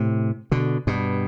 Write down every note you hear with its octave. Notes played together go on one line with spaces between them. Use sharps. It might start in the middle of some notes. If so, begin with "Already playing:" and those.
Already playing: A2 C3
B2 D3
G2 B2